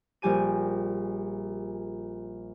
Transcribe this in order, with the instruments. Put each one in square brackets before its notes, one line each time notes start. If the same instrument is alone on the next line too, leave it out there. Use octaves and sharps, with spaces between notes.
[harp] A#1 G3 G4 G#5 D#7